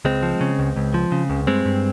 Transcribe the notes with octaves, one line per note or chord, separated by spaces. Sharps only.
C#2 G#3 C4
F3
C#3
C#2
C#2
F3
C#3
C#2
G2 G#3 C4
G2